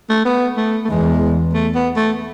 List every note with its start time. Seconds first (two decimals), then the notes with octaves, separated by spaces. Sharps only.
0.10 A3
0.25 B3
0.57 A3
0.84 A3
0.90 E2 G#3
1.54 A3
1.75 B3
1.97 A3